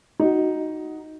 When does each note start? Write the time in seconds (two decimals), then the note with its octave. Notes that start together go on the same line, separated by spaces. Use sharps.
0.20 D#4 F#4